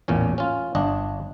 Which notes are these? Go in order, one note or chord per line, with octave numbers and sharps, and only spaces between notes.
A1 E2 A#2 C#4
C#4 F4
G1 D4 D#5